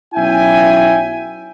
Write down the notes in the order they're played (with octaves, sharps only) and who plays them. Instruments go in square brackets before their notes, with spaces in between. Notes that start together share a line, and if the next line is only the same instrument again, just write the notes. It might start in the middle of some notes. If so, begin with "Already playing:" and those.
[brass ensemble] B1 C#4 E4 E5 G5 G#5